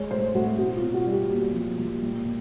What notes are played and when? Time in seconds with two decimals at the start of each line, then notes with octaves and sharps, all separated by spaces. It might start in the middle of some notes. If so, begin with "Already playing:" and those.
Already playing: G#3 C#5
0.11 A2 C5
0.35 A2 F#4
0.58 B2 F#4
0.76 F4
0.83 B2
0.94 F#4
1.06 G3
1.12 G4
1.31 A#2
1.55 F3
1.78 A#2
2.02 A#2
2.25 A#2